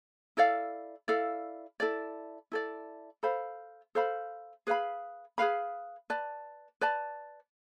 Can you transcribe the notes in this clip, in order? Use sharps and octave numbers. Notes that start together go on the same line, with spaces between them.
E4 A4 D5 F5
E4 A4 D5 F5
E4 A4 D5
E4 A4 D5
A4 C5 F5 B5
A4 C5 F5 B5
G#4 B4 F5 B5
G#4 B4 F5 B5
B4 D5 A5
B4 D5 A5